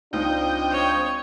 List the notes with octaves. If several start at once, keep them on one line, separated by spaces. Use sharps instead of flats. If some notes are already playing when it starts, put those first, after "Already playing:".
C#2 C4 D4 D#4 F4 D#5 G5
C#5